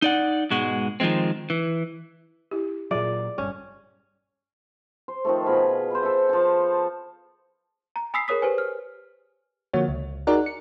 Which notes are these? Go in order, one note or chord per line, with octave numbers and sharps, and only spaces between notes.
D#4 D5 F#5
G#2 B2 G#3 F#4
D#3 F3 G3 G#3 C4
E3
E4 G4
A#2 F#3 F4 G#4 D5 E5
G1 G2 C#4
C5
D#3 F3 A3
B2 F4 G#4 B5
B4 C5
A4 E5
F3 A5
A#5
G#5 B5 D#6 E6 B6 C7
G#4 A#4 C#5 D#6 B6
G4 B4 C5 G#5
F6
D3 F3 A#3 F#4 C#5
C#2
D#4 F#4 G#4 A#4 D5 F#5
C#7